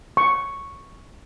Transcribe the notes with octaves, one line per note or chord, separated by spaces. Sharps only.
C#6